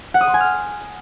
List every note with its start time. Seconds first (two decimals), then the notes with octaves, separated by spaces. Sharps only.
0.14 F#5
0.21 D#6
0.27 C6
0.34 G#5
0.41 F6